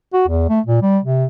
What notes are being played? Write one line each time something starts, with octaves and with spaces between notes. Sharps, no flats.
F#4
E2
A3
A#2
G3
C3